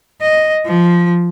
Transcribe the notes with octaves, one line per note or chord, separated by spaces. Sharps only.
D#5
F3